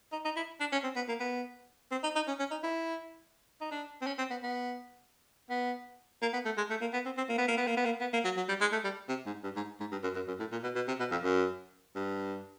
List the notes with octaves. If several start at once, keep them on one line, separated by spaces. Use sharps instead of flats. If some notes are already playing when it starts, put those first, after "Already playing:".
D#4
D#4
E4
D4
C#4
C4
B3
A#3
B3
C4
D#4
D#4
C#4
C#4
D#4
E4
D#4
D4
C4
C#4
C4
B3
B3
B3
A#3
B3
A3
G#3
A3
A#3
B3
C4
C4
A#3
B3
A#3
B3
A#3
B3
A#3
B3
A#3
F#3
F#3
G3
G#3
A3
G3
C3
G#2
G2
G#2
G#2
G2
F#2
F#2
F#2
A2
A#2
B2
B2
C3
B2
F2
F#2
G2